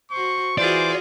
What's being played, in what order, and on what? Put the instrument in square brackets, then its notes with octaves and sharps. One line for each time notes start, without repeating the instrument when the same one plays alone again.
[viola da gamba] F#4 C5 [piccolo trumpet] C#6
[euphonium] E3 [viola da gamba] F4 F#4 G#4 [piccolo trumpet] C5 [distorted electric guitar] D5